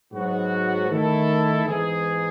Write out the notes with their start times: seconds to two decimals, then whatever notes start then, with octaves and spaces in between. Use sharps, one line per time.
0.12 G#2 F#3 B3 F#4
0.90 D#3 A3 E4 A4
1.66 G#2 E3 B3 D#4 G#4